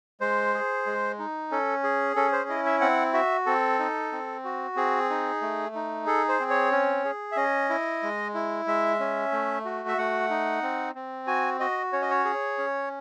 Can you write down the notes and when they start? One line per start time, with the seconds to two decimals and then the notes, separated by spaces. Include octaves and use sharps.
0.20 G#3 C5
0.54 G#4
0.86 G#3
1.19 D#4
1.51 C#4 A4
1.84 G#4
2.16 C#4 A4
2.32 C5
2.49 E4 D#5
2.66 E5
2.81 C4 F#5
3.13 F#4 E5
3.46 C4 A4
3.79 D#4
4.12 C4
4.44 F#4
4.76 C4 G#4
5.10 D#4
5.42 A3
5.75 D#4
6.06 G#4 A4
6.29 C5
6.40 C4
6.50 C#5
6.72 C#4
7.05 G#4
7.32 E5
7.37 C#4 D#5
7.70 E4
8.03 G#3
8.34 E4
8.67 G#3 E5
8.99 C#4
9.32 A3
9.65 F#4
9.88 E5
9.98 A3 F#5
10.30 D#4
10.63 C4
10.95 C4
11.27 F#4 G#5
11.60 F#4 D#5
11.93 C#4 C#5
12.02 D#5
12.11 C#5
12.25 G#4
12.58 C#4